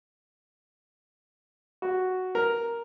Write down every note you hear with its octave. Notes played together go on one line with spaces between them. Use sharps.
F#4
A#4